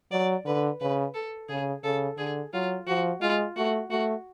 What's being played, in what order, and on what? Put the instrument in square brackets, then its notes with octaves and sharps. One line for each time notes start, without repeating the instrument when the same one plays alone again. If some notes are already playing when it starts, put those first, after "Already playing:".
[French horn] F#3 [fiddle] D5
[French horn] D3 [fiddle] B4
[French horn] C#3 [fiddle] B4
[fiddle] A4
[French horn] C#3 [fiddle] G#4
[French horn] C#3 [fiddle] A4
[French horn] D3 [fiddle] G#4
[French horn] F#3 [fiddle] F4
[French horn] F3 [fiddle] F#4
[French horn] G#3 [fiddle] F4
[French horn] A3 [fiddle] F#4
[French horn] A3 [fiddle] F#4